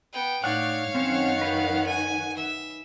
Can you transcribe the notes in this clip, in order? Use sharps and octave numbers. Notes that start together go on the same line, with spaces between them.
B3 G5
A2 D#4 C#5 D5 F5 F#5
F#2 D#3 C4 C#4 C5 F#5
D#4 B4
G#5
E5